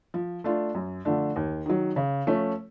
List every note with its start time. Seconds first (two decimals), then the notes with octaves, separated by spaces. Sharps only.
0.14 F3
0.44 A3 D4 F4
0.75 F#2
1.05 D3 F3 A3 D4
1.36 D#2
1.66 D#3 F#3
1.96 C#3
2.27 F3 A3 C#4